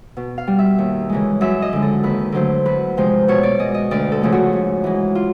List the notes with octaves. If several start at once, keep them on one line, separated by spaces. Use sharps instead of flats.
B2
F5
G3
E5
D#2
C#3 E3 G#3
F#2 E5
D#5
D3 F3 G#3
A4
D#2 B4
D3 F#3 A3 C5
E2 B4
C3 F3 G#3 C5
B2 C#5
D5
G#3 D#5
D#5
D2 D5
A4
C#3 F3 A3
F#4
G#2
E3 G#3
F4